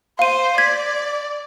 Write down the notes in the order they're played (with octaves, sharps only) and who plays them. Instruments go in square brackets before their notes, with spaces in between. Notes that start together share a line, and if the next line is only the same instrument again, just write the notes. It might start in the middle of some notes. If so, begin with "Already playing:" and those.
[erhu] C5 [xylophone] F5 D#7
[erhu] D5 [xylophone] G#6 B6